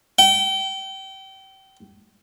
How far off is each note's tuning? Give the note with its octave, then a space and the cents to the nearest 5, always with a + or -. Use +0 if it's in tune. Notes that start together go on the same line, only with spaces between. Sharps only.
G5 -30